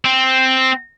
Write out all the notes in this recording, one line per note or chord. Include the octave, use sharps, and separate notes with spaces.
C4